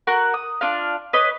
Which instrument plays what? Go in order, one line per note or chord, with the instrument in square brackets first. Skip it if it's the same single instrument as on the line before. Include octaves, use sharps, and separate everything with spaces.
[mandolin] F#4 A#4 F#5
D#6
D4 F4 F5
B4 C#5 D#5